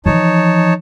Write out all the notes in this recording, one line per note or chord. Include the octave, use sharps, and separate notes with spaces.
E3 F3 D#4 C#5 A5